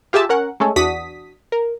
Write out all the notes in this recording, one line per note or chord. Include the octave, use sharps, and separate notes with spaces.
F4 G4 G#4 E5 A5
C#4 A#4 F#5
G#3 A3 C#4 A4
E2 D4 F#4 D#6 B6
A#4